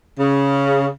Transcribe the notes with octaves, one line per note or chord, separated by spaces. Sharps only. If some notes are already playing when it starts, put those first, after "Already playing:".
C#3